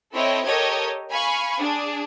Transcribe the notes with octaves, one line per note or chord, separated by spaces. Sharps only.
C4 E4 A4 C#5 D#5 G5
G4 A4 A#4 C#5 D#5 G#6
F5 G#5 B5 C#6
D4 G#4